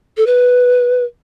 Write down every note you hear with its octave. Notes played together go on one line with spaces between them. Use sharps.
A4
B4